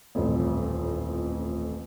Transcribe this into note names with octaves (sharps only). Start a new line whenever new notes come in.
D#1 A1 F2